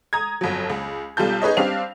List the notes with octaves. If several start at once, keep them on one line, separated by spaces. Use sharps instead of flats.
A#5 D#6 G#6
G1 F2 F#3
C#2
B1 G3 F4 A4 G6
D#4 G#4 B4 C#5 D#5
G3 C4 D4 F5 F7